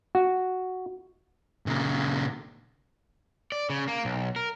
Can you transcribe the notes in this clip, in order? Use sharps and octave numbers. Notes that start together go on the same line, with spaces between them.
F#4
A#2 C#3
D5
C#3
A#3
B1
A#4